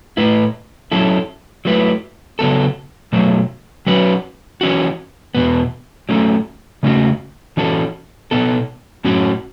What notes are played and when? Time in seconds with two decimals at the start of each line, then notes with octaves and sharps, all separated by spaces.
0.17 A2 A3 E4 B4
0.92 F#3 C#4 E4 A4
1.65 F#3 A3 E4 B4
2.39 C#3 F#3 B3 A4
3.13 B2 F#3 A3
3.87 F#3 C#4 F#4 B4
4.61 E3 C#4 F#4
5.35 E2 B2 B3
6.09 F#3 A3 C#4 A4
6.83 C#3 A3 C#4 F#4
7.57 E3 C#4 F#4 A4
8.31 B2 B3 A4
9.05 A2 F#3 C#4 F#4